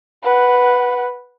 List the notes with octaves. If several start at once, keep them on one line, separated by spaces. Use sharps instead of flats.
B4 F#5